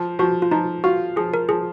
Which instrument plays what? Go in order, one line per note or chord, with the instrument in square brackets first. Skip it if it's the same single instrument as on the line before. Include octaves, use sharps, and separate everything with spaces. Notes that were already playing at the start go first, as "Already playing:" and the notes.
Already playing: [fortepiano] F3
[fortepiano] F3 [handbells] F#4
[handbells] F4
[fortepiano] F3 [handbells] D#4
[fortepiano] F4 [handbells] F#4
[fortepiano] F3 [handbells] G#4
[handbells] A#4
[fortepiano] F3 [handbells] G#4